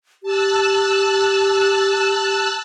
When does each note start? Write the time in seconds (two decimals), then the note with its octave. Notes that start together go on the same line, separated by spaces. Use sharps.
0.23 G4 A5 E6 F#6